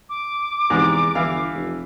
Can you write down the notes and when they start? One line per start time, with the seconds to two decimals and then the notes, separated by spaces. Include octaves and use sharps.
0.09 D6
0.70 E2 G#2 C3
1.15 G1 E3 F5
1.54 F1